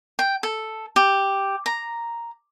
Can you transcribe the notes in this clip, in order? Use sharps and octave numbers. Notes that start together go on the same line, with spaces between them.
G5
A4
G4
A#5